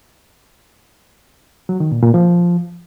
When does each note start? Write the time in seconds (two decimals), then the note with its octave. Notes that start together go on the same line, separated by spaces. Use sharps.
1.69 F#3
1.80 D#3
1.92 A#2
2.03 A#2
2.14 F3